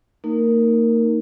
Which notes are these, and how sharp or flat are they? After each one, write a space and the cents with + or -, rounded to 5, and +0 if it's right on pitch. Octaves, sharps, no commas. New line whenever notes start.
A#3 -35 D#4 +0 A#4 +0